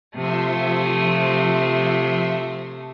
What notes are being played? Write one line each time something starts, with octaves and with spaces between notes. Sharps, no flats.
C3 F3 A3 E5 C6 D#6